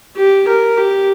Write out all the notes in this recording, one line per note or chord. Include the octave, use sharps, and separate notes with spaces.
G4
A#4
G4